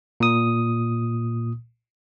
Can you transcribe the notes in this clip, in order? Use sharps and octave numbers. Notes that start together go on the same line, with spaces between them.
A#2 D#6